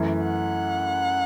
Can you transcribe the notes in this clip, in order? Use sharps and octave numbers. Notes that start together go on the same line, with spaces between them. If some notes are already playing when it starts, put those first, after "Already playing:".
Already playing: F#2 E3 A3
F#5